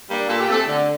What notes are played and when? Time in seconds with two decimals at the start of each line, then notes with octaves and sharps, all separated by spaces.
0.09 G3 A#3 D4
0.28 A#2 A4
0.40 G4
0.48 A3 C4 A4
0.67 D3